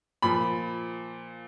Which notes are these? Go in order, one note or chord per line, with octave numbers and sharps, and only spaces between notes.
A#2 F3 B5